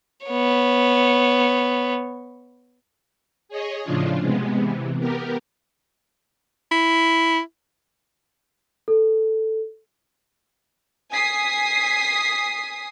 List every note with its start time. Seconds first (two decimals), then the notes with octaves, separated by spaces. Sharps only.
0.26 B3 C#5
3.49 G#4 C#5 D#5
3.83 A2 C#3 F3 D4 F4
4.20 C3 G#3 B3
4.58 C3 E3
4.99 B3 G4 A#4
6.72 E4
8.88 A4
11.13 G#5 D#6 B6 C7